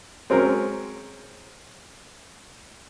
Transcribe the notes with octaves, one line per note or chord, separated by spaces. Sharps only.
F#3 G#3 C4 C#4 A#4